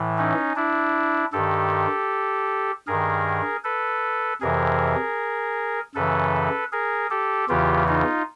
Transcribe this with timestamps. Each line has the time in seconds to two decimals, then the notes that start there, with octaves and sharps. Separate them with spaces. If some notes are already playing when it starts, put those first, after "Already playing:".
Already playing: A2 E3
0.18 C#4 D#4
0.56 D4 E4
1.33 G2 D#3 G4 A4
2.87 G2 D#3 G#4 A#4
3.64 A4 B4
4.41 F2 C3 E3 G#4 A#4
5.95 F#2 C#3 E3 A4 B4
6.72 G#4 A#4
7.10 G4 A4
7.49 E2 C#3 E3 F4 G4
7.88 D#4 F4